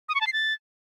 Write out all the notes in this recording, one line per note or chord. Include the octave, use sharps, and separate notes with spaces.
D#6
C#6
A5
C7
A6